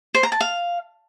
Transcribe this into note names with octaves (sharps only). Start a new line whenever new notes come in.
C5
A#5
A5
F5